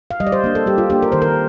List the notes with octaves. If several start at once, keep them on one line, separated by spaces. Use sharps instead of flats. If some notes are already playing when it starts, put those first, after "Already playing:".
F5
G3 D#5
D5
C5
A#3 D4
A4
G3 G4
F4
A#3 D4 G4
A#4
D#3 C5
A#4